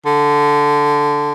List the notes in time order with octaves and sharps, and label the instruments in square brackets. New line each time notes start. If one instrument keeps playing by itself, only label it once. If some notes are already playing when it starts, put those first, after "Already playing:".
[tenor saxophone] D3